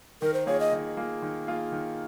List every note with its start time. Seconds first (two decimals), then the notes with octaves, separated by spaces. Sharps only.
0.22 D#3 A#4
0.34 C5
0.46 A#3 F4 G#4 C#5
0.60 D#5
0.72 D#3
0.97 A#3 F4 G#4
1.22 D#3
1.47 A#3 F4 G#4
1.72 D#3